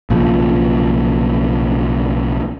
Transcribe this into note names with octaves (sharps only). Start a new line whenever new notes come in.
B1 A#2 C#3 F3